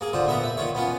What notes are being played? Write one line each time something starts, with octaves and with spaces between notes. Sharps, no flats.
A#3 G#4
D3 F4 C5
A#2 B3 E5 A#5
E5
D#3 F4 C#5
B3 C#4 F4